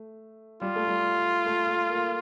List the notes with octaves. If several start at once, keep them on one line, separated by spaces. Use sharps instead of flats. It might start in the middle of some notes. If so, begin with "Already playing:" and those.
Already playing: A3
G3 F4
A3
G3
A3
A3
A#3